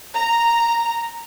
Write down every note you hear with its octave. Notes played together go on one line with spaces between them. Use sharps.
A#5